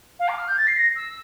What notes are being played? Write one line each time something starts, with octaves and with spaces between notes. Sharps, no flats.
F5
D6
F6
G6
A6
C7
A#6
E6